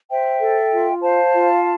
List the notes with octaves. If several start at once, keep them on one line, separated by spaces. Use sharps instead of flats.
C5 E5 G5
A4
F4
C5 F5 A5
F4